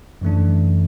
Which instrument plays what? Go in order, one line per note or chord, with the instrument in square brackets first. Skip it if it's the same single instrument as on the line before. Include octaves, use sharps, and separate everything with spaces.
[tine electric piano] F#2 E3 A3 D4